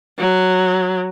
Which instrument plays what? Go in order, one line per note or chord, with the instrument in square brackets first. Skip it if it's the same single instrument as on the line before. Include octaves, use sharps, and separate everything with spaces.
[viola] F#3